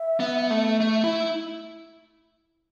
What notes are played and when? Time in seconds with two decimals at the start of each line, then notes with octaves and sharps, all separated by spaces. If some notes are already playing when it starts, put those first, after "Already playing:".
Already playing: E5
0.20 B3
0.50 A3
0.81 A3
1.04 E4